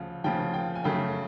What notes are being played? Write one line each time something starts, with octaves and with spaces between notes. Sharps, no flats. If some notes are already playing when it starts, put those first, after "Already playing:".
Already playing: D2 C#3 F3
D2 C#3 F3 G5
G5
G#5
F#2 C#3 F#3 A3 G5